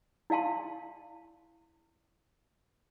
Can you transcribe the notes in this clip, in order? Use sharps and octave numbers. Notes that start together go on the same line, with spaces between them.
E4 D5 F5 A5 C6